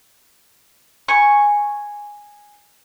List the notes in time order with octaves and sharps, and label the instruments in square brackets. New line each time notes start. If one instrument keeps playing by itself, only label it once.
[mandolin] G#5 C#6